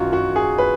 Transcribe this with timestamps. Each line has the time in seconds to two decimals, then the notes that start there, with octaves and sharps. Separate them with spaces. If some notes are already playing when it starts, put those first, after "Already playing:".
Already playing: F#2 D#3 F#3 F4 F#4
0.13 F#4
0.36 G#4
0.58 B4